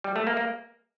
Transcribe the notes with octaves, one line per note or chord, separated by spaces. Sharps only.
G3
A3
A#3
A#3